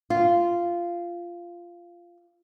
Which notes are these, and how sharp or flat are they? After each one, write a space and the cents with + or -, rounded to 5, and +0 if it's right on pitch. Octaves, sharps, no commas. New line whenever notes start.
F4 -10